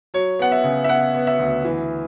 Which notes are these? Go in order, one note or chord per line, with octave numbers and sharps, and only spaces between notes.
F#3 C#5
B3 F#5
E5
C#3
E5
B3 F#5
B3
E5
D2
E3